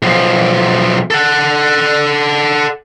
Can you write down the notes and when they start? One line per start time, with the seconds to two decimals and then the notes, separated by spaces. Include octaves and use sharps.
0.02 B1 F3
1.11 A4 F#5